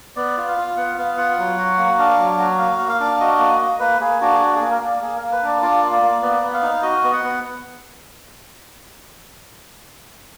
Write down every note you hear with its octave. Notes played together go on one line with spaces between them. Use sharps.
B3 D5
F4
F5
F4
B3 F#5
B3 F5
F4 F#5
F#3
F#4
A#3
D4 F5
F#3
F#4
A#3 F5
A#3
F5
D4
F#4 D#5
A#3
A#3
A#3 B4
A#3 G#4
D4 F#4
G#4
F#4
G#4
A#3
A#4
A#3
D5
A#3 G#4
A#3 A#4
B4
D4 D5
F4 D5
A#3
D5
A#3
B3 D5
B3
F5
D#4
F#4 D#5
B3
F#5
B3